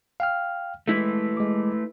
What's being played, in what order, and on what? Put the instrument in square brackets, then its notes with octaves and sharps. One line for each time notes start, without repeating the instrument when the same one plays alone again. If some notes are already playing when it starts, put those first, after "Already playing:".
[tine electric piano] F5 G5 F6
[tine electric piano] G#3 [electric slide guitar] A3 E4 B4
[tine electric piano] G#3 D6